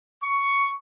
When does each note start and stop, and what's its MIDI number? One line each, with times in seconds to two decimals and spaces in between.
0.23 0.72 85